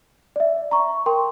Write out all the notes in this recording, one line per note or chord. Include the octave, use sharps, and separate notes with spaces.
D5 E5
A#5 C#6
A#4 G5 C6